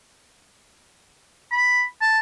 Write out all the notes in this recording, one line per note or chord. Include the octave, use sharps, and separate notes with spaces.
B5
A5